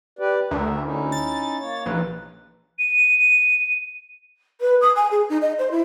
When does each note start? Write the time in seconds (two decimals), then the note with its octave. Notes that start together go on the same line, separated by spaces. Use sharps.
0.19 G4 B4 D5
0.51 D2 A#4 E5
0.83 C#4 D#4 E4
1.12 A6
1.60 A#3 C#5
1.86 A#1 D#4 B4
2.79 D#7
4.61 B4
4.81 D#6
4.96 G#5
5.11 G#4
5.29 D#4
5.41 D#5
5.59 C5
5.71 E4